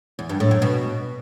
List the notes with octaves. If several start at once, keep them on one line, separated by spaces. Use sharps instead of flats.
E2
G2
A2
F#2
B2